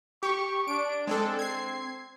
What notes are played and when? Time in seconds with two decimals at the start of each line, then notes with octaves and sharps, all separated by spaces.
0.23 G4 C#6
0.68 D4 D7
1.07 G#3 C4 D4 A4
1.39 G#6 C7